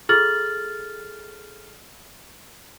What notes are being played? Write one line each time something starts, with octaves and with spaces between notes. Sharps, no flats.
F4 G#4 A4 F6 A6 F#7